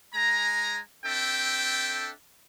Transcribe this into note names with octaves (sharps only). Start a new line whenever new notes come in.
G#3 G#5 A#5
C4 D4 A4 E5 G5